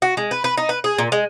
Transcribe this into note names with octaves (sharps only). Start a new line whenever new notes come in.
F#4
G#3
B4
B4
D#4
B4
G#4
A#2
G#3